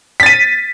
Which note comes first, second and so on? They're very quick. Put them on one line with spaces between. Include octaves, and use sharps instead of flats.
B6 A6 D#7